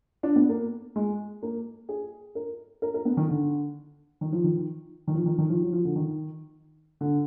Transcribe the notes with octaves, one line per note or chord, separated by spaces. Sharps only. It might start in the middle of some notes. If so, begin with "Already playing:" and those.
D4
B3
A#3
G#3
A#3
G#4
A#4
A#4
A#4
B3
D#3
D3
D#3
F3
D#3
D#3
F3
D#3
D#3
F3
F#3
F3
D3
D#3
D3